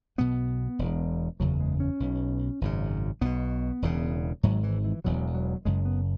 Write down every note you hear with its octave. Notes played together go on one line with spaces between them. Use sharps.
B1 B2 B3
E1 E2 B2
F#1 E2 C#3 F#3
G#3
C#4
B1 B2
G#1 F#2 C#3
B1 B2 B3
E1 E2 C#3
G#1 G#2 F#3
E3
E3
E1 E2 B2 F#3
F#3
F#1 F#2 C#3 G#3
B3